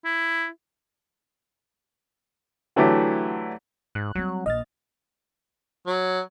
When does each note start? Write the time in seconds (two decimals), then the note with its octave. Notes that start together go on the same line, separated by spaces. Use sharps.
0.05 E4
2.76 D3 E3 F#3 A3 E4 G4
3.95 G#2 F#6
4.15 F#3 G3 C4
4.46 A#1 D#5 F6 A6
5.87 F#3